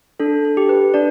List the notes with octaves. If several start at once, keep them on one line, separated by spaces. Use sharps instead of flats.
D4 A4
A4
G4
B4
D4 D5